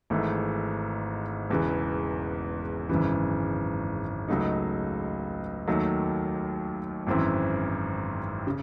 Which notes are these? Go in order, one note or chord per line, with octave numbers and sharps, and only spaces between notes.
G#1 G#2 E3 A3
E1 E2 C#3 E3
G#1 F#2 C#3 E3
C#2 C#3 F#3 A3 D#4
D#2 D#3 F#3 A3
G#1 F#2 E3 C4 E4
C#3